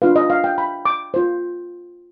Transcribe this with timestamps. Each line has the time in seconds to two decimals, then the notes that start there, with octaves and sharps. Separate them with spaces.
0.02 D4 F4 B4 F5
0.16 D#5
0.30 F5
0.44 G5
0.58 B5
0.85 D6
1.14 F4 C5